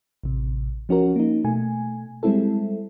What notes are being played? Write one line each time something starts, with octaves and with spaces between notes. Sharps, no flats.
A1 C3
F3 C#4 F#4 A#4
A#3 D#4
B2 A3 G#5
G3 G#3 C4 E4 A4